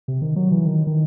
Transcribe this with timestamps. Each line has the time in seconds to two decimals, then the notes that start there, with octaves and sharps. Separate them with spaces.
0.08 C3
0.22 D#3
0.36 F#3
0.52 E3
0.65 D#3
0.87 D#3